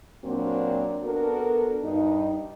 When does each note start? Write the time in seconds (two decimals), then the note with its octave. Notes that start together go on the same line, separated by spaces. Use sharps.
0.24 A#2 F#3 A#3 C4 D4 F#4
1.04 B3 D4 F#4 A4 A#4
1.83 G2 D#4